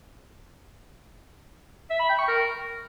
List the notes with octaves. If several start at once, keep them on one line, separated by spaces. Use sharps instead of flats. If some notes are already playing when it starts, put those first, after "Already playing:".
E5
B5
G5
C#6
A#4